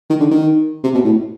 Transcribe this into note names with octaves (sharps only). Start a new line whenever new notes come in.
D#3
D3
D#3
C3
B2
A2